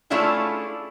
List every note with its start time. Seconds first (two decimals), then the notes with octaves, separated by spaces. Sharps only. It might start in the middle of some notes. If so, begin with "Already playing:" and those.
0.10 A3 C#4 D4 E4 F4 G#4